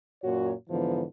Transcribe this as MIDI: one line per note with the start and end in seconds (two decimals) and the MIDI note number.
0.23 0.53 42
0.23 0.53 46
0.23 0.53 66
0.23 0.53 73
0.70 1.04 44
0.70 1.04 50
0.70 1.04 52
0.70 1.04 53
0.70 1.04 59